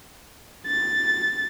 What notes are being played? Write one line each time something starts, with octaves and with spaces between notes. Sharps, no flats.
A6